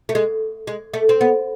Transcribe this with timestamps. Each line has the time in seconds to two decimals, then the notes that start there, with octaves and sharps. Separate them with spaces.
0.09 A3
0.15 G#3
0.67 G#3
0.94 A3
1.09 C4
1.21 B3